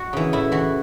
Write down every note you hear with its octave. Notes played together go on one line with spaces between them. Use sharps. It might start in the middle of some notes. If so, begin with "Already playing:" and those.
Already playing: F#4
C#3 E3
A2 E4
E3 F#4